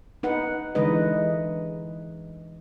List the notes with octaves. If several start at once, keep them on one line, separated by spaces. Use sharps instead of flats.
D#4 B4 F#5
D3 E3 G#3 D#4 B4 D#5